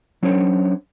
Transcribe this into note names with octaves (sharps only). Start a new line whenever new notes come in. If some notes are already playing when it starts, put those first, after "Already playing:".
F#3 C#4 D4 C5 C#5